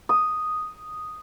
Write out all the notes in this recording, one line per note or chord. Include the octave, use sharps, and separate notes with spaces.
D#6